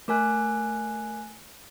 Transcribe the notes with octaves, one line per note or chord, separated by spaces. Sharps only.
A3 A#4 G#5 F#6